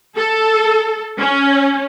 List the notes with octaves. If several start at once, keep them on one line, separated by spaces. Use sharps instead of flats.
A4
C#4